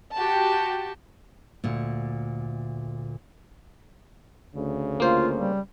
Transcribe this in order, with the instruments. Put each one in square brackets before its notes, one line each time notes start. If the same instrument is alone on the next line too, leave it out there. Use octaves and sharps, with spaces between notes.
[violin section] F#4 G4 A5
[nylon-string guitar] D2 A#2
[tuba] D2 [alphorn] C#3
[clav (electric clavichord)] A#3 C5 [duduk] F4
[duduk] G3